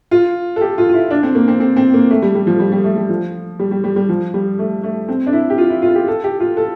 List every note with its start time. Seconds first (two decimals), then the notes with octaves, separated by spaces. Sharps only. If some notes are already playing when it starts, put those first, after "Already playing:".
0.11 F4
0.56 A4
0.61 G4
0.78 F4
0.89 F4
0.94 E4
1.10 D4
1.23 C4
1.35 A#3
1.48 C4
1.60 C4
1.76 C4
1.94 A#3
2.10 A3
2.22 G3
2.35 G3
2.47 F3
2.60 G3
2.72 G3
2.84 A3
2.97 G3
3.09 F3
3.59 G3
3.71 G3
3.84 G3
3.96 G3
4.09 F3
4.34 G3
4.59 A3
4.83 A3
5.08 C4
5.26 D4
5.33 E4
5.50 G4
5.58 F4
5.70 E4
5.82 F4
5.95 G4
6.08 A4
6.24 G4
6.40 F4
6.57 A4